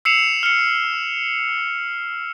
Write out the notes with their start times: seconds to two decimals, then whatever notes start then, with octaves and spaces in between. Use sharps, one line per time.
0.05 E6 C7 C#7 E7 F7
0.43 F6 C#7